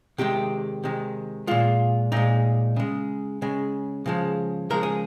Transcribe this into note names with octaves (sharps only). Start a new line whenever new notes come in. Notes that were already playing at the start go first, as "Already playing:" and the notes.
C3 D#3 G#3 G4
C3 D#3 G#3
A#2 G#3 F4
A#2 G#3 D#4
C#3 G#3
C#3 G#3
C#3 F3 G#3
C#3 F3 G#3 A#4
G#4